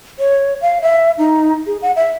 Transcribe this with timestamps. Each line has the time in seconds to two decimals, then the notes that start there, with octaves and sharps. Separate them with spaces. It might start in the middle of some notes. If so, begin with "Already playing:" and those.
0.19 C#5
0.61 F5
0.82 E5
1.18 D#4
1.66 G#4
1.82 F#5
1.96 E5